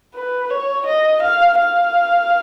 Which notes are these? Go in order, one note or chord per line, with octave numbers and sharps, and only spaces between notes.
B4
C#5
D#5
F5
F5